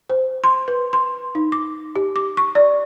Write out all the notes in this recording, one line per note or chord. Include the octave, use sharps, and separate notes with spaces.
C5
C6
B4
C6
D#4
D6
G4
D6
C#6
D5